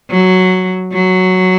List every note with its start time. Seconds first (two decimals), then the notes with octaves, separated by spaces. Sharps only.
0.10 F#3
0.93 F#3